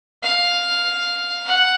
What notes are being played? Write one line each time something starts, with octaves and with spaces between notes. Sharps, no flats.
F5
F#5